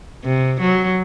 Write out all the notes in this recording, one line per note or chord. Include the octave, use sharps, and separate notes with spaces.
C3
F#3